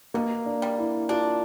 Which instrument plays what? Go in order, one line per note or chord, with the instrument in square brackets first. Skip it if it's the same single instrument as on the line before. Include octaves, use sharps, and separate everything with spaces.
[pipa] B2 [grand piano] A#3
[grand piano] D4
[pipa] G3
[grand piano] E4
[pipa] D4 [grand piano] F4